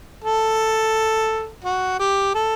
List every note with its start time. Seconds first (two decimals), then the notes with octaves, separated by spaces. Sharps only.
0.24 A4
1.64 F#4
1.99 G4
2.34 A4